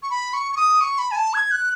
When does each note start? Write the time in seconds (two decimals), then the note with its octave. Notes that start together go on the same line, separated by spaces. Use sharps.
0.02 C#6
0.10 B5
0.33 C#6
0.52 C#6
0.57 D#6
0.81 C#6
0.98 B5
1.11 G#5
1.16 A5
1.34 G#6
1.51 F#6